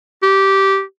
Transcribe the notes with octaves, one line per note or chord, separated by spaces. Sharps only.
G4